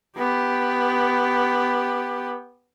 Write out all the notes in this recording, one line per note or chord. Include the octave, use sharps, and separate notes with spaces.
B3 G4